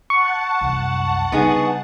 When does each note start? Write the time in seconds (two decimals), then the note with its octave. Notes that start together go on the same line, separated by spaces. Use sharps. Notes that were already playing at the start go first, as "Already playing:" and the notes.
0.10 F#5 A5 C#6
0.61 C2 F#2
1.32 C#3 G3 B3 D#4 G#4